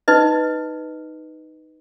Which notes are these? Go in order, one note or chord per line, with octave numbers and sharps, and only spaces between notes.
D#4 B4 D#5